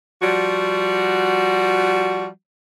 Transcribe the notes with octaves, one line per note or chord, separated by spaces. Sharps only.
F3 G3 F#4